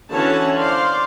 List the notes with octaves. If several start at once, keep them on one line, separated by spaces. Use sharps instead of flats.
D3 E3 C#4 F#4 C#5 A5
C5 D5 F5 C6